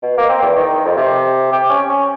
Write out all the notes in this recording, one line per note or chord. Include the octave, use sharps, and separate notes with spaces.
B2
A#3
C4
E2
D#3
F2
C3
G4
C#4
C#4